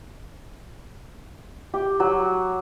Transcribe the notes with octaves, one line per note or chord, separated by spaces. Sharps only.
G4
F#3